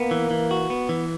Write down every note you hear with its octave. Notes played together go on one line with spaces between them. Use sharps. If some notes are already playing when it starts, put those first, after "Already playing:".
Already playing: A#3 B3
E3
E3
F#4
B3
E3